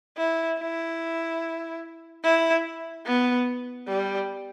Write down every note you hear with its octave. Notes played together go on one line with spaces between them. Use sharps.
E4
E4
E4
B3
G3